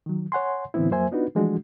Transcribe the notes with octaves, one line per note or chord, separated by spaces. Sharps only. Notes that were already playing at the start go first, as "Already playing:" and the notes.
D#3 F#3
C#5 F#5 G#5 C6
A2 D3 E3 B3 C4 E4
F2 F#3 A#3 C5 E5 G#5
B3 D4 D#4 F4 F#4 B4
E3 F3 G#3 A3 D4 F#4